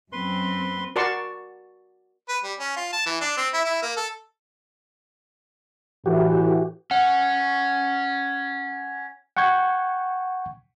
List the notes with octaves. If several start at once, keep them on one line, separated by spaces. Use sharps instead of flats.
F#2 C4 B4 C6
F#4 A#4 D5 A5 C6 C#6
B4
G3
C#4
F4
A5
E3
D4
C4
E4
E4
A#3
A4
A2 E3 F#4 G4
C#4 F#5
F#5 G5 C#6 G6 G#6